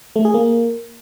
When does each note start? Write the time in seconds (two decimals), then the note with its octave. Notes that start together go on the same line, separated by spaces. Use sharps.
0.16 A3
0.25 G#4
0.34 A#3